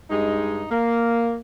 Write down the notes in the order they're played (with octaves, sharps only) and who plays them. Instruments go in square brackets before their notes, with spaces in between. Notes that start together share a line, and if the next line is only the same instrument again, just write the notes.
[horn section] G2 G#3 D#4
A#3